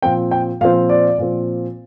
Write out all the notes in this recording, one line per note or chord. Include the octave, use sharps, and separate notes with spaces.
A#2 F3 C4 G5
G5
A#2 F3 C4 F5
D5
A#2 F3 C4